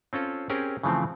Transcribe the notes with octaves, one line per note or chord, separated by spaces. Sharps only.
C4 C#4 F4 A4
C4 C#4 G4 G#4 A#4
C#3 E3 F3 A3 C4